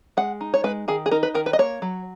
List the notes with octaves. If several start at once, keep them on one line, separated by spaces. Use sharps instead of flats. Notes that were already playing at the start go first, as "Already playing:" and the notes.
G#3 F#5
D#4
C#5
G#3 B4
D#3 G#4
G#4
D#4 A#4
B4
D#3 A#4
B4
D#5
A#3 C#5
F#3